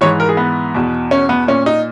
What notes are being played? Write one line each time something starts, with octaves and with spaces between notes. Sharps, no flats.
G#2 E3 C#5
A#4
G#4
B3
E2 B2
C#4
B3
A#2 C#4
D#4